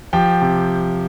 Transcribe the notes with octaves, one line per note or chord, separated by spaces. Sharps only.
F3 G4 G5
C3